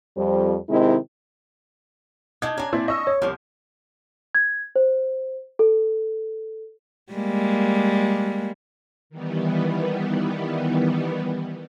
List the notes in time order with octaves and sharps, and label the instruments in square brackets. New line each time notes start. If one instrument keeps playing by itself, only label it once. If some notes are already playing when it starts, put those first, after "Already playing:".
[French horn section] F2 G3 C5
C3 D#3 G#3 C4 E4 D#5
[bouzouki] D4 D#4 [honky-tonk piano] G#6
[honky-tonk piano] C#4 [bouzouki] D4 G#5 [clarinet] A#5
[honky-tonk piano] A#2 C4 E4 [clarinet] D5
[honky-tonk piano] D#5 E6 [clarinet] C#6
[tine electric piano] C#5
[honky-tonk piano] C2 [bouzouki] F3 A#3 [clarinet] G4
[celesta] G#6
C5
A4
[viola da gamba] G3 G#3 A#3
[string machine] D#3 E3 G3 B3